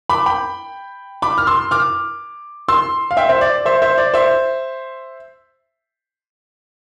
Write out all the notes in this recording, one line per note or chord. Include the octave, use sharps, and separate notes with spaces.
B5 D6
G5 B5
B5 D6
F6
C6 E6
D6 F6
C6 E6
F5
E5 G5
C5 E5
D5
C5 E5
C5 E5
D5
C5 E5